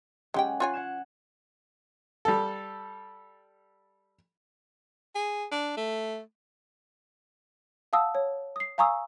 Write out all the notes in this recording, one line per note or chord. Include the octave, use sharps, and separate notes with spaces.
G#3 C#4 G4 F#5 G5
F4 C#5 G#5 F#6 A6 C7
F#5 G#6 E7
G3 A4
G#4
D4
A3
F5 F#5 A5 D#6 E6
C#5
D#6 C7
F5 G#5 A#5 C#6 D#6 E6